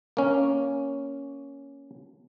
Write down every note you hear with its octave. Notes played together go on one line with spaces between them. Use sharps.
A#3 C#4